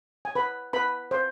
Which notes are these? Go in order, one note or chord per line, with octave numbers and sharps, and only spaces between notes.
G#5
B4 B5
B4 B5
C5